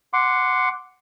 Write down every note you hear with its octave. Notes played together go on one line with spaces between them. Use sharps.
F#5 C6 D6